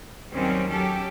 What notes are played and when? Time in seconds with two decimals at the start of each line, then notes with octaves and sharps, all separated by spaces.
0.33 D#2 D#3 F#3 G3 C4 C#4
0.70 F#3 C#4 G4 A4